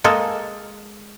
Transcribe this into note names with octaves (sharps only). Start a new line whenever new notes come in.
G#3 A#3 A4